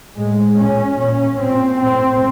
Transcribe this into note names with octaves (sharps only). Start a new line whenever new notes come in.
A2 G#3
A#2 C#4
A#2 C#4
A#2 C4
A2 C4